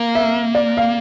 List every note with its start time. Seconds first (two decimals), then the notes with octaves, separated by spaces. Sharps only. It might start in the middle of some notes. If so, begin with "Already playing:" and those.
Already playing: A#3 F5
0.15 E5
0.55 D5
0.77 F5